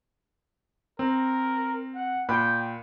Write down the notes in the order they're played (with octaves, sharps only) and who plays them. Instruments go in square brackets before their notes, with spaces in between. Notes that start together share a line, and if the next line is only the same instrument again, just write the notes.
[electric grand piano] C4 [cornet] A#4
[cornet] F#5
[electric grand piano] A#2 B5 F#6 [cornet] G5